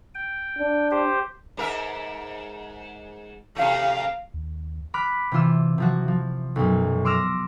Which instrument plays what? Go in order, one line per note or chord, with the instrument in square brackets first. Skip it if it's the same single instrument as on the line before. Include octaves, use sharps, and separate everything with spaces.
[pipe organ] G5
[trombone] D4
[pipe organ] G4 C5
[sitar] G#2 A#4 E5
[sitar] C3 A3 [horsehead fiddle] F5
[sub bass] D#2
[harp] B5 D6 F6 F#6 B6
C3 E3 F4 E6
C3 F3 F#4
F3
B1 F#2
C6 D6 E6 F6 A#6